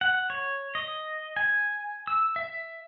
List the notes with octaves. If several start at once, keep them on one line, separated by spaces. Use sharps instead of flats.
F#5
C#5
D#5
G#5
E6
E5